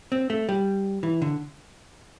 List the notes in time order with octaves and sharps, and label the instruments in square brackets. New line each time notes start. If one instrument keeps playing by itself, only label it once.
[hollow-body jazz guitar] C4
A3
G3
E3
D3